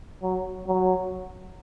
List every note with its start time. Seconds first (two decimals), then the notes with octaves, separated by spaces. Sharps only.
0.23 F#3
0.67 F#3